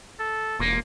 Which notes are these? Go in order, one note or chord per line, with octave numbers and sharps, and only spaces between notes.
A4
E1 A#2 A#3